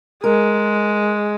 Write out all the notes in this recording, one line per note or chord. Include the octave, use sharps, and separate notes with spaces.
G#3 A#4